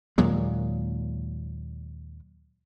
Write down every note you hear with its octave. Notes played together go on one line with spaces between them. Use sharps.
D#2 A#2 F#3 G#3